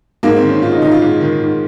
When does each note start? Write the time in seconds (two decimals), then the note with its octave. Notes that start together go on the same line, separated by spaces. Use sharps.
0.23 G#2 A#3
0.37 C4
0.43 D#3
0.49 C#4
0.62 G#2 F4
0.72 D#4
0.82 D#3 D#4
0.91 F4
1.02 G#2
1.21 D#3
1.41 G#2